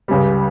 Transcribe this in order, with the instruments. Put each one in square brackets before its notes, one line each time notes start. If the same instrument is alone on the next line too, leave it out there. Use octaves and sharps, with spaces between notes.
[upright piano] C#2 C#3 G3